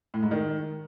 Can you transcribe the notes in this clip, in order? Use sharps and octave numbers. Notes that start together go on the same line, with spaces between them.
A2
G#2
D#3